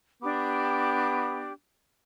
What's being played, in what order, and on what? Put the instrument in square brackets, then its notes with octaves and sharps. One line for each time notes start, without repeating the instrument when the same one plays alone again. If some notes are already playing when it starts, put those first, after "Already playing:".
[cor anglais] B3 [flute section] D4 G4 D6